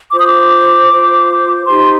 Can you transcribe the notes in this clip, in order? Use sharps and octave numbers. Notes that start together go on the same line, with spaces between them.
F4 C5 D6
D#6
D6
F4 C5
D#4 G4 C5 C6